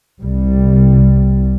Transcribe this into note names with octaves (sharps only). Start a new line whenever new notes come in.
C2 G3